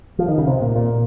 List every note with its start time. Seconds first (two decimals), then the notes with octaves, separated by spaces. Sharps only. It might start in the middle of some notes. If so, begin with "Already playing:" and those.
0.19 F3
0.28 D#3
0.38 C#3
0.47 C3
0.62 A#2
0.76 A#2